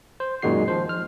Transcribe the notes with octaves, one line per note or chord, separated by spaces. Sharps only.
C5
F#2 A#2 D#3 G#3 F#4 C7
F3 C5
F6